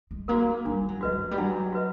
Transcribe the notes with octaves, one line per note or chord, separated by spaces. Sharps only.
G#3
A#3 F#4 A#4
G3 D4
F#3
E3 F#4 B4 D#5
F3
G3
F#3 D4
F#4 B4 D#5